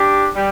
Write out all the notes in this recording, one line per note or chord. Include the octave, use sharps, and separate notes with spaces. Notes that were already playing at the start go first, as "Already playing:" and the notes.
Already playing: D4 G4
G3